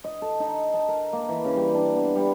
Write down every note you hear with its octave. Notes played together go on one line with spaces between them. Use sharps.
D#5
A4
D#4
A5
A#4
A#3
E3
C#3
G3
D4
B3
G3